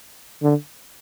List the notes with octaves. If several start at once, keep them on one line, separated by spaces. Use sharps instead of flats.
D3